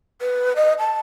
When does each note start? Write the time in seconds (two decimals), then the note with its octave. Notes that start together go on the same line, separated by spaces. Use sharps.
0.21 B4
0.56 D#5
0.78 A5